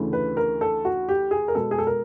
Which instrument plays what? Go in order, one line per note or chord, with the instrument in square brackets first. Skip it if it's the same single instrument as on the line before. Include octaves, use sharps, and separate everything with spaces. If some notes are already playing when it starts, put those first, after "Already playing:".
Already playing: [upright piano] D2 C#3 E3 A3
B4
A#4
A4
F#4
G4
G#4
A#4
B2 G#3 B3 A4
G#4
A4
A#4